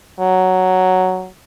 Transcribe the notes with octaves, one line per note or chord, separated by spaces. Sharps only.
F#3